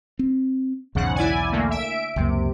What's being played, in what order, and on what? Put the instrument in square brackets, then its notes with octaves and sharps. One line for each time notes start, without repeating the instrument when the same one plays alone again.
[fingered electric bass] C4
[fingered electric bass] B1 E2 [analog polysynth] G#2 C#3 F#5
[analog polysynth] E4 D5 G#5
D3 A3 A#3
E5 D7
[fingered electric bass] C#2 F#2 A#3 [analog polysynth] C3